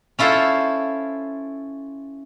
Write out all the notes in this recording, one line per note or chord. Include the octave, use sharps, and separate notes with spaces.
C#4 E4 F4 A4 C5